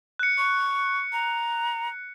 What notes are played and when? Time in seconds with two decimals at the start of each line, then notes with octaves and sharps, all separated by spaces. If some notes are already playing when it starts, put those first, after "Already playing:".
0.19 F#6 C#7
0.38 C#6
1.13 A#5